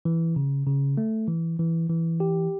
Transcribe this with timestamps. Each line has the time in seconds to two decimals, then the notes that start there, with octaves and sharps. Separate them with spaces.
0.05 E3
0.36 C#3
0.66 C#3
0.97 A3
1.28 E3
1.59 E3
1.90 E3
2.20 G4